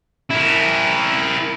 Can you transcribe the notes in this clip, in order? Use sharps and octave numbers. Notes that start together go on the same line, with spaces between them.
E4 A#4